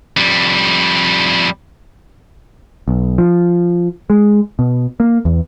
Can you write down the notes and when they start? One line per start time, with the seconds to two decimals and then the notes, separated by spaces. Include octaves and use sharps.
0.17 F2 G3
2.88 B1
3.18 F3
4.10 G#3
4.59 B2
5.00 A#3
5.25 E2